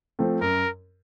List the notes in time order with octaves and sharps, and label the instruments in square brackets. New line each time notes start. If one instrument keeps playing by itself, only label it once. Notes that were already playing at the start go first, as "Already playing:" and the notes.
[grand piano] F3 A3 C4
[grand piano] F#2 [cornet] A#4